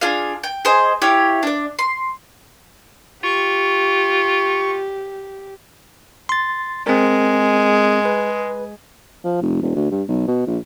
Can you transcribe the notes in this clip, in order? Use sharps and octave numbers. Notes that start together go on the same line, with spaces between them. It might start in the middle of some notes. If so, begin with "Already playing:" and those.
D4 F4 G#4 F5
G5
G#4 C5 D#5
E4 G4 C#5 F5
D4 D5
C6
F4 G4 C#6
C6 A6
G#3 C4 A#4
B4
F3
F1
E1
D2
G2
B1
B2
A#1